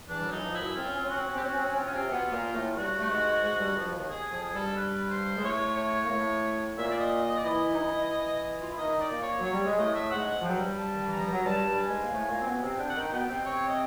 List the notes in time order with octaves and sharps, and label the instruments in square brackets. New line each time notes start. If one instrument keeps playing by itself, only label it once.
[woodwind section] E2 E3 [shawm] D4
[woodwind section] G3
F#2 F#3
[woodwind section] E3 [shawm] D#4
[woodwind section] F2 F3
[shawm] E4
[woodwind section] F#2 F#3
[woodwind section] C4 [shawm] F4
[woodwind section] C#4
C4
[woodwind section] C#4 [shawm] F#4
[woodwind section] C4
C#4
[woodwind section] C4 [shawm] G4
[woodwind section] C#4 [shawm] F#4
[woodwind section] C4
C#4
[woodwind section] C4 [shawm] F4
[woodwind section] C#4
C3 C4
B2 B3
A#2 A#3
A2 A3
[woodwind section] G2 G3 [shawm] F#4
[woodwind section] A3
G#2 G#3
G#2 G#3
G2 G3
F2 F3
D#2 D#3
[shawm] G#4
[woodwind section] F2 F3 [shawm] G#4
[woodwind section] G2 G3 [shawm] A4
[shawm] B4
C5
[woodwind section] G#3
[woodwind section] A2 A3 [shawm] C#5
[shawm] C#5
[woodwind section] A#3
A2 A3
[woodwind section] A#2 A#3 [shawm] E5
[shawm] D5
D#5
D#5
D5
[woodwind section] E3 E4 [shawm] D#5
[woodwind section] D#4
E3 E4
E3 E4
F4
E4
[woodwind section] D#3 D#4 [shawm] D#5
[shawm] D5
[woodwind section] A#2 A#3
[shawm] C#5
[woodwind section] F#3
[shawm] C#5
[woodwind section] G3
G#3
[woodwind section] A2 A3 [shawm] D#5
[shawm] E5
[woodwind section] G#2 G#3 [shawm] F#5
[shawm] F#5
[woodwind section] F3
[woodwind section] F#3 [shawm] G5
[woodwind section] G2 G3
[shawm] A5
[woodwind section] D#3
E3
[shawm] A#5
[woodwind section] F3
F#3
[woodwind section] G2 G3 [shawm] A5
[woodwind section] G2 G3
[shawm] G#5
[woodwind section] G#2 G#3
A#3
A2 A3
A#2 A#3
C4
B2 B3
C3 C4
[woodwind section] D3 D4 [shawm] G5
[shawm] F#5
[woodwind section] D#3 D#4 [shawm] G5
[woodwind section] B2 B3 [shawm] G5
[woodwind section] C3 C4
[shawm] C#5
D#5